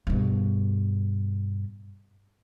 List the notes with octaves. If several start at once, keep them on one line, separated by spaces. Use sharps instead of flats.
G2 B2